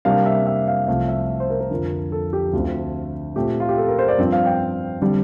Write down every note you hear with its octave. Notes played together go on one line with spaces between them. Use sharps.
C3 G3 A#3 D4 F5
E5
E5
F5
C2 C3 F3 A3 F5
E5
C5
A#4
A#4
F2 D3 F3
A4
G4
D2 D3 A3 C4 F4
A#2 A3 C4 G4
F4
G4
A4
A#4
C5
D5
G2 F3 C4
F5
G5
D3 G3 C4